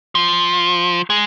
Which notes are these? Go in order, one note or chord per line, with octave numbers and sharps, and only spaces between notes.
F3
G#3